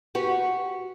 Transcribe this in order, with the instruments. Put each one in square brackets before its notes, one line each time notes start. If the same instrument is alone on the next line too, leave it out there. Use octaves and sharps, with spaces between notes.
[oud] F#4 G4 B4